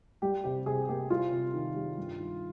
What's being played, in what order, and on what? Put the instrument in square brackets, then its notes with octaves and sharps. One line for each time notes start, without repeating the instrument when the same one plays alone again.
[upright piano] G3 G4
C3 G4
C3 G#4
A#3 G4
G3 F4
C3
D#3
G3
G2
D#3